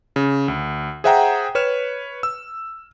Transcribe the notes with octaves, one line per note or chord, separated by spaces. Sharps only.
C#3
D2
G#4 C5 E5 F#5 G5 A#5
B4 C#5 F6 E7
E6